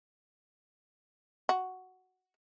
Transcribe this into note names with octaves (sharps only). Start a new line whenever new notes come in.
F#4